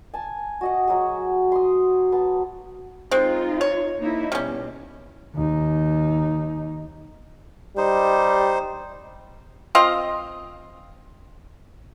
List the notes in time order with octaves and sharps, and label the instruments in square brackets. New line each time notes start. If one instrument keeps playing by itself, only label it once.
[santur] G#5 A5
F#4 D#5 F#5
F#3 G#3 G#4
C6 D#6
B3 A5
[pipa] G#3 C4 [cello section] D#4 F4
[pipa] C#5
[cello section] A#3 D#4 E4
[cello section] B2 [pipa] G3 C#4
[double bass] D#2 D#4
[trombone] G3 [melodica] D#4 C5
[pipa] C4 F4 D#5 F5